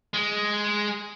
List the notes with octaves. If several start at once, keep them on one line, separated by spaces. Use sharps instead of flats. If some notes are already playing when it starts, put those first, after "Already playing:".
G#3